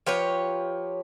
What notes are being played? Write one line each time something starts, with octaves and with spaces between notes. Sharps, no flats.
F3 G4 B4 C#5